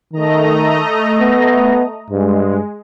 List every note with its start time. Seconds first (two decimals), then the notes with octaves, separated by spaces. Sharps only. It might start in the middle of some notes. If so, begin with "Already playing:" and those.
0.13 D#3 A3 D#5 A#5
1.20 B3
2.10 G2 G#3